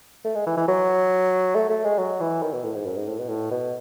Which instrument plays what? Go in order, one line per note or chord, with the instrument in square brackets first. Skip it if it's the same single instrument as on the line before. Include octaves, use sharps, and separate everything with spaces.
[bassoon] A3
G#3
E3
E3
F#3
A3
A3
G#3
F#3
E3
D#3
B2
A2
G#2
F#2
G#2
A2
B2
A2
B2